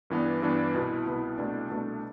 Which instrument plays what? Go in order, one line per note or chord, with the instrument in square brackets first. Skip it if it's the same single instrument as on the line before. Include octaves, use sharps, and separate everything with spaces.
[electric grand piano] G2 E3 B3 D4
G2 E3 B3 D4
C2 B2 B3 E4
C2 B2 B3 E4
C2 B2 A3 D4
C2 B2 A3 D4